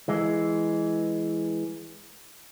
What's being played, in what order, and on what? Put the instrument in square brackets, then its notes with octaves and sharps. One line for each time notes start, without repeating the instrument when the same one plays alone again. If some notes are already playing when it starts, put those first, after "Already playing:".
[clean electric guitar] E3 G#3